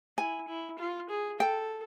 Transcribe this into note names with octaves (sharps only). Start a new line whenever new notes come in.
E4 G#5
E4
F4
G#4
A4 G5